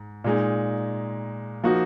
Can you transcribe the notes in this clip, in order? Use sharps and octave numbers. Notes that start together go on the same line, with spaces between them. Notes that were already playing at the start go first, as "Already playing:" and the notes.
Already playing: G#2
A#2 G#3 D#4
F3 A#3 D#4 F#4